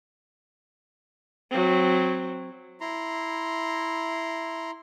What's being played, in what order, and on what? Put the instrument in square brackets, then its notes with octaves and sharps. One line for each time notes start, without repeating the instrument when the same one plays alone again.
[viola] F#3 C4
[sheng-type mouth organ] E4 A#5 C6